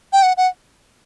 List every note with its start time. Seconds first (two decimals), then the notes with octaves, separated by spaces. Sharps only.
0.13 G5
0.23 F#5
0.37 F#5